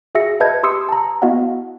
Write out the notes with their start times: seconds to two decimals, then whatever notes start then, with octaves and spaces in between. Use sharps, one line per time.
0.15 F#4 G#4 E5 E6 A#6 C#7
0.40 B4 D#5 E5 A5 G6 G#6
0.63 G4 C6 D#6 E6 C#7
0.89 A5 A#5
1.22 B3 E4 F#4 D#5 F5 F#5